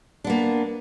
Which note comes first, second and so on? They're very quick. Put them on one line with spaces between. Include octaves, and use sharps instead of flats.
D4 B3 A#3